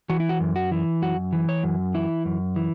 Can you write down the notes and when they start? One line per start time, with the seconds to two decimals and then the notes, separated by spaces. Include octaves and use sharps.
0.09 E3 F#4
0.20 E4
0.29 F#4
0.40 F#2
0.56 F#4
0.71 E3
1.02 F#2 F#4
1.33 E3
1.49 C#5
1.63 F#2
1.94 E3 E4
2.25 F#2
2.56 E3